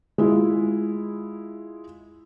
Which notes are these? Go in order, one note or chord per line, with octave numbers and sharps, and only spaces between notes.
G#3 E4 F4